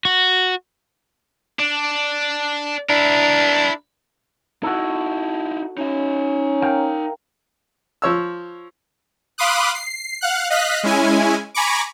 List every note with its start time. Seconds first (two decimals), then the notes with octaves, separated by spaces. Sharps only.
0.05 F#4
1.59 D4
2.90 D4 E4 A#4
4.63 D#4 E4 F#4 A4
5.78 C#4 D#4 E5
6.62 A#4 F5 G5
8.02 F3 C#5 E6
9.38 F5 B5 C6 D6 D#6 F#6
9.75 C7
10.21 F5 F#5 F#6
10.50 D#5 F5 F#6 B6
10.83 G#3 C#4 E4 G#5
11.55 G#5 A#5 B5 C#6 D6